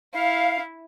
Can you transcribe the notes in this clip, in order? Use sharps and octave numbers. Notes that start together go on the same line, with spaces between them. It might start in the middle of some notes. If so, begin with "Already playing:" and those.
E4 F5